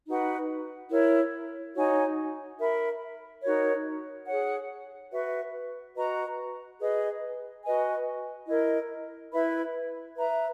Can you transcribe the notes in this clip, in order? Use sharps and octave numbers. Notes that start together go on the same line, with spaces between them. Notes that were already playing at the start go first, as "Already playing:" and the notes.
D#4 F#4 B4 F#5
E4 A#4 C#5
D#4 F#4 C#5 G#5
A#4 E5 B5
D#4 F#4 A#4 C#5
G#4 C#5 F#5
F#4 B4 E5
F#4 B4 D#5 A#5
G#4 B4 D#5
F#4 B4 D#5 G#5
E4 A#4 D#5
E4 B4 E5 B5
B4 E5 A#5